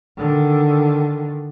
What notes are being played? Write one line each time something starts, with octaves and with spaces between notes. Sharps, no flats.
D3 D#3